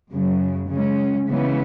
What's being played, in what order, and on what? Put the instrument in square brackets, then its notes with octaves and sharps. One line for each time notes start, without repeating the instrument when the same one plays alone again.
[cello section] F#2 C#3 F#3
C#3 G#3 C#4
C#3 E3 G#3 B3